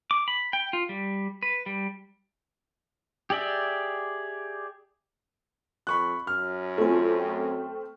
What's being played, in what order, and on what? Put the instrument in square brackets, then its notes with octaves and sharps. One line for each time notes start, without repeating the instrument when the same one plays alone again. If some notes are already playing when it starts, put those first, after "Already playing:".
[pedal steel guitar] D6
B5
G5
F4
G3
B4
G3
G4 G#4 D5 E5
[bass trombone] F2 [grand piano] B5 C#6 F#6
[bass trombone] F#2 [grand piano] F6
[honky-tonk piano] A3 C4 [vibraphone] F4 G#5
[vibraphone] G5